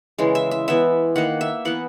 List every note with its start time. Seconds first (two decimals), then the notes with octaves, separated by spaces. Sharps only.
0.18 C#3 E3 G#3
0.35 E5
0.51 E5
0.68 E3 B3 E5
1.16 D#3 A#3 F#5
1.41 E5
1.65 E3 B3 F#5